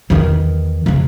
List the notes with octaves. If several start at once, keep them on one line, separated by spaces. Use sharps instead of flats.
E2 D#3
F2 C#3